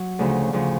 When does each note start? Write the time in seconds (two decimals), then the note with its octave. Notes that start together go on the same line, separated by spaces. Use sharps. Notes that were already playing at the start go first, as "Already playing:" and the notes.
Already playing: F#3
0.19 D2 C#3 F3
0.53 D2 C#3 F3